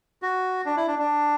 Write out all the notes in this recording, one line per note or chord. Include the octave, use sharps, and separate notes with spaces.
F#4
D4
E4
D4
D4